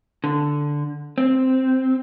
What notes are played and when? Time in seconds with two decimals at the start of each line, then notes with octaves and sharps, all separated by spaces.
0.24 D3
1.18 C4